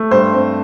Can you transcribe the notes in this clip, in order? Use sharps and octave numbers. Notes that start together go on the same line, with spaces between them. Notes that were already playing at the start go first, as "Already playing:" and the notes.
Already playing: A3
G2 C5
C4